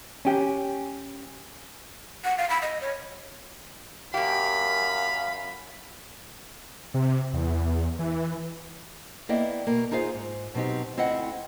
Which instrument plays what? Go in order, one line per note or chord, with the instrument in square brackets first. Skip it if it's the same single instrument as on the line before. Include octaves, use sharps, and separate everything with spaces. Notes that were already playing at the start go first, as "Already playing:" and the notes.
[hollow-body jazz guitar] C#4 G4
[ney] F#5
F5
B5
D#5
C#5
[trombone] F#2 [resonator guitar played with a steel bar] A#3 G4 [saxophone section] F5 [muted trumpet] B5
[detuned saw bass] C3
E2
E3
[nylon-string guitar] A#3 B3 E4 D5 D#5 G5
B2 A#3
D#4 F4 G#4 C5 F5
G#2
B2 F#3 C4 D#4 G4
D2 C4 E4 D#5 F#5